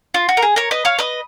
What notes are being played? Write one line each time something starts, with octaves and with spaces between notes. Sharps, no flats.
F4
F#4
A#4
G#4
A#4 C#5
B4 D#5
C#5 F5
B4 D#5